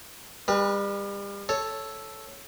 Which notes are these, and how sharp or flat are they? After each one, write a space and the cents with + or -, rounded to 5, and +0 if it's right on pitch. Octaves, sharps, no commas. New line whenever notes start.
G3 +35 B4 -25
A4 +0 C#5 +0